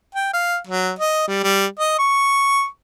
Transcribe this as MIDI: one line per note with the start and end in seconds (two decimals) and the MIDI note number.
0.15 0.29 79
0.33 0.57 77
0.67 0.91 54
0.99 1.26 75
1.28 1.40 55
1.43 1.66 55
1.79 1.95 75
1.99 2.65 85